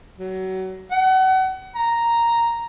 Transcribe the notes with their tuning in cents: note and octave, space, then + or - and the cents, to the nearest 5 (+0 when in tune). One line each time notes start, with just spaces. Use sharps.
F#3 +25
F#5 +30
A#5 +0